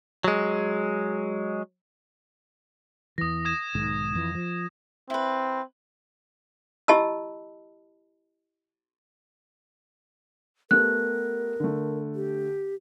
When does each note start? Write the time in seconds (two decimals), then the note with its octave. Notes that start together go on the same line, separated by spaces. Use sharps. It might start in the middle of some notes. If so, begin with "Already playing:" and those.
0.24 F#3 G#3
3.18 E2 E3 D#6 A#6
3.45 D#6 G#6 E7
3.75 B1 G#2 D#3
4.15 F2 E3
4.35 F3
5.10 C4 E4 B4
6.88 E4 G4 D#5 A5 B5 E6
10.71 A3 B3 G4 A#4 F#6
11.60 D3 A3
12.15 G4